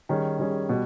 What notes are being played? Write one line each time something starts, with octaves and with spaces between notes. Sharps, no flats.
D#3 G3 C#4 G#4
D#3 G3 C#4 G#4
B2 G3